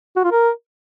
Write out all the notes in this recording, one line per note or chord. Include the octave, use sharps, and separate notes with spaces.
F#4
F4
A#4